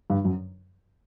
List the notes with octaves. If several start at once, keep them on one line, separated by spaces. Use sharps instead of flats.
G2 G3
F#2 F#3